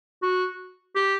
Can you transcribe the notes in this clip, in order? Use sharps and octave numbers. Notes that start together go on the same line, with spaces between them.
F#4
G4